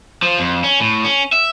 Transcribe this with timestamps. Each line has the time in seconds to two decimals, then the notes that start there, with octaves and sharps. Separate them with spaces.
0.22 F3
0.39 F2
0.64 C#4
0.80 A2
1.04 C#4
1.32 E5